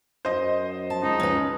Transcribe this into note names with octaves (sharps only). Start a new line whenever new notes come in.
F#2 C5 D#5
A5
C#2 D#4
C#4 B4